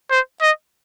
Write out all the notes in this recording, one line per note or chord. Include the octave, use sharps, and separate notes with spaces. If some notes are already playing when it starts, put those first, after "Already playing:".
C5
D#5